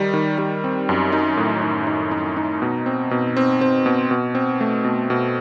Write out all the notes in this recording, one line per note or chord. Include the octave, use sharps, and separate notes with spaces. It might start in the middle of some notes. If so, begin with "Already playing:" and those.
Already playing: D#3 G3
D#3
G3
C4
F#2
D#4
A2
D#4
D#4
D#4
D#4
B2
C4
B2
C4
C4
B2
B2
C4
A3
B2
B2